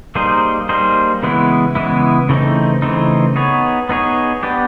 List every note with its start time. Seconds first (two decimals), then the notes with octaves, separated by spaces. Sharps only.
0.15 G3 A#3 D#4 G#4 C5
0.69 G3 A#3 D#4 G#4 C5
1.23 C#3 E3 G#3 B3 E4
1.75 C#3 E3 G#3 B3 E4
2.29 C#3 E3 A3 C4 D#4
2.82 C#3 E3 A3 C4 D#4
3.36 B3 D#4 G#4 C#5
3.89 B3 D#4 G#4 C#5
4.43 B3 D4 G4